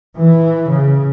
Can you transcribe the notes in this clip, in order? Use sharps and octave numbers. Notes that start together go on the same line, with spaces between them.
E3
C#3